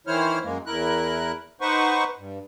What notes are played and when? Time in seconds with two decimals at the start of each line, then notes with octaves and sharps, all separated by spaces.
0.07 D#3 E3 E4 C5 C#5 F6
0.43 F#2 G#3 A#3
0.66 E2 E4 A#4 F#6
1.61 D#4 B4 C5 F#5 C#6
2.18 G2